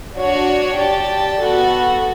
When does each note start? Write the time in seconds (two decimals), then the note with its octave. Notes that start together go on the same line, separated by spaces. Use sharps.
0.17 D4 F#4 C#5
0.78 G4 D5 A5
1.41 B3 F#4 A4